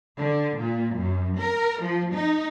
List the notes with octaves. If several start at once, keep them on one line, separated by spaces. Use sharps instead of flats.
D3
A#2
F#2
A#4
F3
D#4